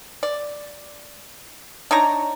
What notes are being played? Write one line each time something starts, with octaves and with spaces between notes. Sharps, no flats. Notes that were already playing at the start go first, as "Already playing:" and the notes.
D5
D4 D#4 C#5 A#5